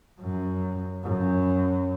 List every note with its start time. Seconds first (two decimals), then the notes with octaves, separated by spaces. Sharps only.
0.20 F#2
1.03 F#2